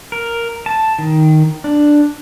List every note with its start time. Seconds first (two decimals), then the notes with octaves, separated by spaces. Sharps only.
0.12 A#4
0.66 A5
0.99 D#3
1.64 D4